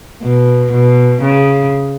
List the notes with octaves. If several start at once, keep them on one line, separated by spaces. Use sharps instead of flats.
B2
B2
C#3